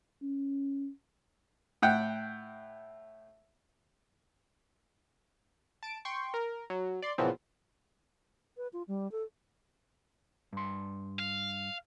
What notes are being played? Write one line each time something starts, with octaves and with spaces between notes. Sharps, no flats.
C#4
A2 F#5 G5
A5 D7
G5 C6 C#6
A#4
F#3
D5 C6
A#2 C#3 E3 F3 B3 C4
B4
F4
G3
A4
G2 C6
F5